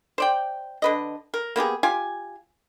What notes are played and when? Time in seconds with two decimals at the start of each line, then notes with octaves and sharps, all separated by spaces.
0.18 C5 D5 G5
0.82 D3 B4 D#5
1.34 A#4
1.56 A#3 B3 G4 G#4
1.83 F4 G4 G#5